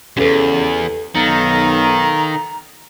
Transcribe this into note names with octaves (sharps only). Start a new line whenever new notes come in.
E2 G#2 C#3 G4 A4 B4
B1 D#3 A4 F5 A#5 A6 C#7